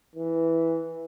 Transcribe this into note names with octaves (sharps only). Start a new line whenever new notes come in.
E3